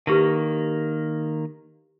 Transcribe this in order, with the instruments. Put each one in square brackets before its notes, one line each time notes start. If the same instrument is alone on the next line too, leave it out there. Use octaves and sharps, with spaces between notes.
[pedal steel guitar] D#3 A#3 [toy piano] E4 G4 B4